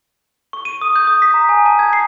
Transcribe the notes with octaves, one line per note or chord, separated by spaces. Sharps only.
C#6
D#7
D#6
G6
D#6
B6
A#5
G#5
A5
G#6
C7